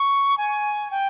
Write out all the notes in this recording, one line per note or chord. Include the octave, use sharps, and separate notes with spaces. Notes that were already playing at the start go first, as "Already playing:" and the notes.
Already playing: C#6
G#5
G5